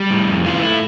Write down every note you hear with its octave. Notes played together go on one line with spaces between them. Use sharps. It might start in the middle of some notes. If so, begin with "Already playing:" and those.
Already playing: G3
A2
F2
E3 F4
A3 E4